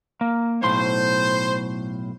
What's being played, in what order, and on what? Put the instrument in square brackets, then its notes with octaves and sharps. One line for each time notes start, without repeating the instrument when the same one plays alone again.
[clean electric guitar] A#3
[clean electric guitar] B1 A2 C6 [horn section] C5